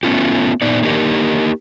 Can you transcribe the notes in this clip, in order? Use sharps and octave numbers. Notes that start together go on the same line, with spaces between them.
A3 B3 C#4 F4 G4
A#2 B3 D#4 D5
A#3 D4 D#4 G4 A4 A#4